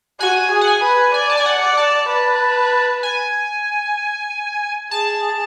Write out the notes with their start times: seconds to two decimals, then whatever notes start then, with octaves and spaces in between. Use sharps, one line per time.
0.20 F#4 G#5
0.51 G#4
0.61 F#5
0.68 G#5
0.83 B4
1.14 D5 G#5
1.30 A5
1.37 G#5
1.46 F#5
1.62 D5
1.77 A5
2.09 B4
3.03 G#5
4.91 G#4 A5